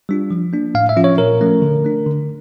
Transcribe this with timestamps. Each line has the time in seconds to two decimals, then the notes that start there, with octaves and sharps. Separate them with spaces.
0.09 G3 D4 F4
0.31 F3
0.53 A#3 D4
0.75 A2 F5
0.89 E5
0.97 F3 C#4 F4
1.04 C#5
1.18 A#2 A#4
1.41 F3 A3 C#4
1.62 D3
1.84 A3 D4
2.06 D3